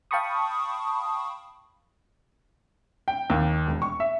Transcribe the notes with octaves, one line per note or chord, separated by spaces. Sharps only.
F5 G5 A5 B5 C#6 D#6
G5
D#2
E1
C#6
E5